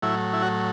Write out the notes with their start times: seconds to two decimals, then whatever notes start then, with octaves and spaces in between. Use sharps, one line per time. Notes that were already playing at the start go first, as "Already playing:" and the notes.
0.03 A2 F#3 E4
0.33 E4
0.42 F#4